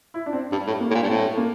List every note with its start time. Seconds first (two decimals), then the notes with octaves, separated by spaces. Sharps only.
0.14 E4
0.26 D4
0.33 C4
0.52 G2 G3
0.67 A2
0.80 A#3
0.91 A2
0.95 A#2
1.03 G2
1.09 A2 C4
1.37 A#3